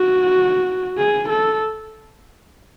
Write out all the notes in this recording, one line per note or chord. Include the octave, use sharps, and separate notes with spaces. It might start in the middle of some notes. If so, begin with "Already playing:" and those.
Already playing: F#4
G#4
A4